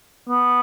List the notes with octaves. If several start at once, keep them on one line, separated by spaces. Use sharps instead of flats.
B3